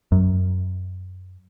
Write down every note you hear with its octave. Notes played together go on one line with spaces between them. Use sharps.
F#2